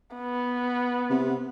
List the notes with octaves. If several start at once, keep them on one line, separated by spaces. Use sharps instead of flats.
B3
C3